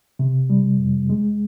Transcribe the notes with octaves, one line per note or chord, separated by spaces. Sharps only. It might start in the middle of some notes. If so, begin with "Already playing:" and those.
C3
G3
F2
G#3